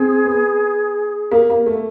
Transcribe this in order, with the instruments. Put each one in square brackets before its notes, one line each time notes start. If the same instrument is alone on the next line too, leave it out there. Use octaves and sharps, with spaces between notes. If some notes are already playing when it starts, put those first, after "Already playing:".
Already playing: [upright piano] C4 [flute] G#4
[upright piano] B3
A#3
A#3
A3